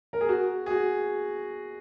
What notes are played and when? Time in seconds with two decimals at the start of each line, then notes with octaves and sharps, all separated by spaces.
0.13 A#4
0.21 G#4
0.29 F#4
0.66 G#4
0.71 F#4